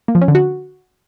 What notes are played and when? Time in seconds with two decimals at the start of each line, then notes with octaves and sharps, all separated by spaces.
0.08 A#3
0.15 F3
0.22 C#4
0.28 D3
0.35 F#4